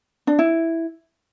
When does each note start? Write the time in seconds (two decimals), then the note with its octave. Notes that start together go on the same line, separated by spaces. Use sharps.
0.27 D4
0.39 E4